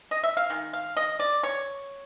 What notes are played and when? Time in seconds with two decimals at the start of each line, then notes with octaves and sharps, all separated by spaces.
0.11 D#5
0.24 E5
0.37 F5
0.50 D#3 G#3
0.73 F5
0.97 D#5
1.20 D5
1.43 C#5